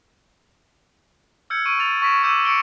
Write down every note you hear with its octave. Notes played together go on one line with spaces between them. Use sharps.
E6 F6 G6 G#6 C#7
C#6 D7 D#7
A6 F7
C#6 A#6 B6 D7 E7
C#6 D6 E6 G6 D#7 E7
C#6 C#7 D7 G7